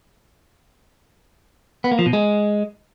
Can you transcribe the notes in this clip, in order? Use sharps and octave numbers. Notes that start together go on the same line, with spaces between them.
B3
A#3
F3
B2
G#3